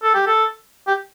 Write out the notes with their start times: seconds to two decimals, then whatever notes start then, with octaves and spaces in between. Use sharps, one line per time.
0.03 A4
0.14 G4
0.27 A4
0.87 G4